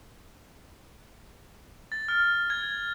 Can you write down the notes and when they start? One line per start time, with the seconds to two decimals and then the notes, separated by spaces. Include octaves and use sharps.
1.92 A6
2.08 F6
2.50 G#6